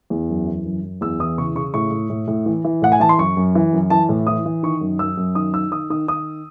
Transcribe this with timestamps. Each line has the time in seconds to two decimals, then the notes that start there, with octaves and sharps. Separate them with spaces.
0.10 E2
0.29 F#2
0.47 E3
0.65 F#2
0.83 F#2
1.01 E2 E6
1.20 E3 D#6
1.38 C#3 C#6
1.55 C#3 C#6
1.74 A2 C#6
1.91 A2
2.10 A2
2.28 A2
2.46 E3
2.65 E3
2.82 A2 F#5
2.92 G#5
3.00 E3 A5
3.09 C6
3.18 F#2 C#6
3.37 F#2
3.55 E3
3.73 F#2
3.90 E3 A5
4.09 A2
4.27 E3 D#6
4.46 E3
4.63 D#3 C#6
4.81 F#2
4.99 F#2 E6
5.17 F#2
5.35 D#3 D#6
5.53 D#3 E6
5.71 D#3 D#6
5.90 D#3 D#6
6.08 D#3 D#6